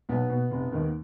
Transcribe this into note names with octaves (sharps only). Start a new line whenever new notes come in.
B1 B3
B2
F1
D#2 D#3